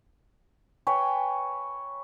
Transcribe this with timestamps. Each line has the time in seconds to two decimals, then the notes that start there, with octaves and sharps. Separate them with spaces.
0.87 B4 C#5 G5 G#5